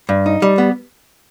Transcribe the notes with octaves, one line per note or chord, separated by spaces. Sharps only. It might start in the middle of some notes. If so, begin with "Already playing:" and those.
G2
D#4
G3
B3